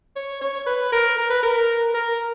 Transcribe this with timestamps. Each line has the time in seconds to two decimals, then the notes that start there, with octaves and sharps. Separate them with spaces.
0.16 C#5
0.41 C#5
0.66 B4
0.92 A#4
1.17 A#4
1.30 B4
1.43 A#4
1.94 A#4